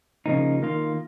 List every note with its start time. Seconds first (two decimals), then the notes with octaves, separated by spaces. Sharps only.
0.26 C#3 F3 A#3 D#4
0.62 D#3 A#3 F4